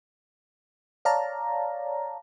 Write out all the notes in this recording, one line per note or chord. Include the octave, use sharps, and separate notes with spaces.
C#5 D5 F5 A5 A#5